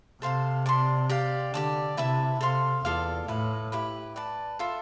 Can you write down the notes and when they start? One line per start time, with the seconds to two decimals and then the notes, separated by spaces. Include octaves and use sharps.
0.21 C3 A4 C5 F5 A5
0.66 D5 A5 C6
1.09 G4 D5 F5
1.53 D3 G4 D5 A5
1.97 C3 E4 B4 E5 A5
2.40 C3 A4 C5 F5 C6
2.85 E2 F4 A4 D5 F5
3.28 A2 E4 B4 F5
3.72 E4 G4 B4
4.16 B4 D5 A5
4.59 F4 A4 E5